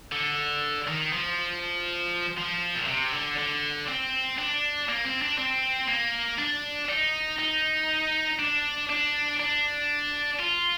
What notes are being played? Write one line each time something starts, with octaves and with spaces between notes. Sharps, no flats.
D3
D#3
F3
F3
A#2
C3
D3
D3
C4
D4
A#3
C4
D4
C4
A#3
D4
D#4
D#4
D4
D4
D4
F4